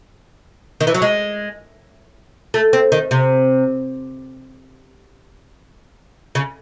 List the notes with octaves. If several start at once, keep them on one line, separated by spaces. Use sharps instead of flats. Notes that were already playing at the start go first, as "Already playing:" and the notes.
D#3
E3
F#3
G#3
A3
C4
D#3
C3
C#3